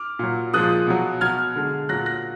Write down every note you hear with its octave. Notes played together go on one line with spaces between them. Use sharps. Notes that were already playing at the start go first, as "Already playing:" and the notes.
Already playing: D6 F6
A#2 F#3
A#2 F3 G#3 D#6 F#6
B2 F#3
B2 F#3 F6 G#6
D3 G#3
A#2 F#3 F#6 A#6
F#6 A#6